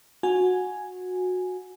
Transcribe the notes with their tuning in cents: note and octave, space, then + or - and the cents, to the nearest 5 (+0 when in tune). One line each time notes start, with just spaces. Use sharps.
F#4 -20 G#5 +0